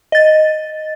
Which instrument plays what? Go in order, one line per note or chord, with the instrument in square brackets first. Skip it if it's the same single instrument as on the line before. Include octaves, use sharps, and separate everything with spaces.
[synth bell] D#5 A6